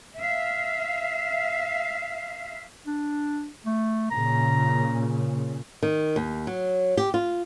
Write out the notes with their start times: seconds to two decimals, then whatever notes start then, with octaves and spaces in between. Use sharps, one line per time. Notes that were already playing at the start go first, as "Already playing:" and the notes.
0.17 E5 F5
2.86 D4
3.66 A3
4.10 A#2 C#3 A#5
5.83 D#3
6.16 D#2
6.47 F#3
6.97 G4
7.14 F4